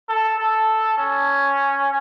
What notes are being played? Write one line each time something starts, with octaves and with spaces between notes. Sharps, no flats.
A4
A4
C#4